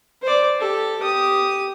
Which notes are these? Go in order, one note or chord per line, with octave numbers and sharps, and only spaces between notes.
C5 D5
G4 A4
G4 D#6